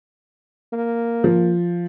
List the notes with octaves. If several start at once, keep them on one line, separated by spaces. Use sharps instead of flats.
A#3
F3